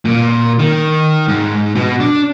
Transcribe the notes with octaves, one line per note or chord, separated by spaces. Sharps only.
A#2
D#3
G#2
B2
D4